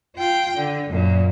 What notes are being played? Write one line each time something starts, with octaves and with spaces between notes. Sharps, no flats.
F4 G5
D3
F#2 A#2